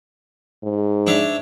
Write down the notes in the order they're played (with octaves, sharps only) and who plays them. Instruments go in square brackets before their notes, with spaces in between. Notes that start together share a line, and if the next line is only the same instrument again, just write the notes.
[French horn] G#2
[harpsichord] D4 C#5 E5